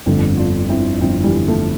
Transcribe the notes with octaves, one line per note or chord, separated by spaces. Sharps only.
G1 F2 D3 A3 C4
D4 F4
C4 E4
G1 F2 D3 C4 E4
E3 G3
F3 A3